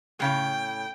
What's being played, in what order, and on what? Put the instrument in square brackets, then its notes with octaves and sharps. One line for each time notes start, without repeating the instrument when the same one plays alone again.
[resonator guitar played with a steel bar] A2 C#3 G#3 [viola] G5